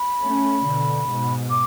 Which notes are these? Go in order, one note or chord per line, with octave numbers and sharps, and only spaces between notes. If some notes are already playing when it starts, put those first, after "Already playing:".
Already playing: B5
A3 C#4
B2 D3
G#2 B2
D6